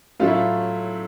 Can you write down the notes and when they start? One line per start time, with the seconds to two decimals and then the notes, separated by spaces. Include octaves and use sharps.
0.20 A2 F#3 A3 F4
0.27 E4
0.35 F4